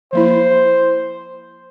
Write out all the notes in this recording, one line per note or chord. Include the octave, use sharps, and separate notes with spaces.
F3 A#3 E4 C5